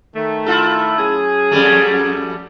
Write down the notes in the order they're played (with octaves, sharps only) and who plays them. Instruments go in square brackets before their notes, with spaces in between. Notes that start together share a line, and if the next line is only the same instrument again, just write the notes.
[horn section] D#3 A3
[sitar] E4 F4 A4
[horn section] F#3 C#4 G#4
[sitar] F2 G3 A3